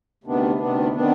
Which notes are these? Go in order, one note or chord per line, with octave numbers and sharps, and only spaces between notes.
D2 C3 D#3 B3 D4
D2 C3 D#3 B3 D4
C3 D#3 B3 D4